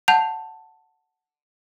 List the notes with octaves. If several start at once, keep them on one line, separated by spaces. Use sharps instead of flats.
F#5 A5 G6 F7